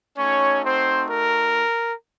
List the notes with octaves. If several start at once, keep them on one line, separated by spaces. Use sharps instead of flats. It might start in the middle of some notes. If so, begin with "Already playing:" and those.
A3 C#4 D#4 F#4 C#5
C4 C5
A#4